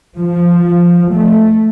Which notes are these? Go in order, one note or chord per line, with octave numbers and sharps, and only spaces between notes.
F3
A3